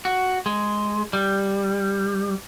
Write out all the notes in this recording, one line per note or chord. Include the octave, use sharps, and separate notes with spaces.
F#4
G#3
G3